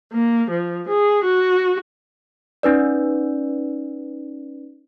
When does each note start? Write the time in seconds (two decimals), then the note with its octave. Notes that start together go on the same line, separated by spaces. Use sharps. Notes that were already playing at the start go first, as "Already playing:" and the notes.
0.11 A#3
0.50 F3
0.89 G#4
1.24 F#4
2.63 C#4 D#4 B4 D5